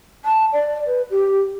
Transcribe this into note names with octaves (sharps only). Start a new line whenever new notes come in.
A5
D5
B4
G4